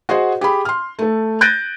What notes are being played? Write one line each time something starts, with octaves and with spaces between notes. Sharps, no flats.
F#4 G#4 C5 D#5 F#5
G4 G#4 B5
C6 F6
A3 A4
F#6 G6 A6 A#6 D7 D#7